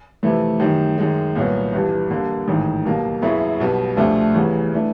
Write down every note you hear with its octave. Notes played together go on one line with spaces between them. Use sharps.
F2 C3 E3 A3
F#2 D#3 G3
F#2 D#3 G#3
C2 A#2 F#3 B3
G1 G2 E3 G3
G2 D3 G3 A#3
A1 G#2 D#3
B1 B2 G3 A#3
F#2 C#3 F#3 B3 E4
B1 B2 G3 B3
D2 C3 F3 A3 D4
E2 C#3 E3 G3
E3 A3 D4